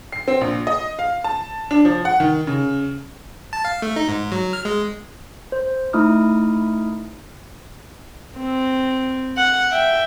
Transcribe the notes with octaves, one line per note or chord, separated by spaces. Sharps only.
C7
C4
A#1
D#5
F5
A5
D4
F3
F#5
D#3
C#3
A5
F5
A3
D#4
G#2
F#3
F6
G#3
C5
A3 D#4 E4 D#6 F6
C4
F#5
E5 G5